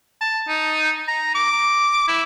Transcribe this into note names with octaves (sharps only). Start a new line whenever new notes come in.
A5
D#4
A#5
D6
E4